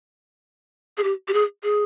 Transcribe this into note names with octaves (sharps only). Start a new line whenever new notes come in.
G#4
G4
G4
G#4
G#4